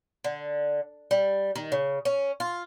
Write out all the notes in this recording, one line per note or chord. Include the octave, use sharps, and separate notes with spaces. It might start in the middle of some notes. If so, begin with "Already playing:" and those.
D3
G3
D#3
C#3
C#4
F4